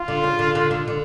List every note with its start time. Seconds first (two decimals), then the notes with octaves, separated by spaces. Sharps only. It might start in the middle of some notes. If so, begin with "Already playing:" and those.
Already playing: F4
0.08 D3
0.24 C#3
0.39 D3
0.55 D3
0.71 D3
0.88 D3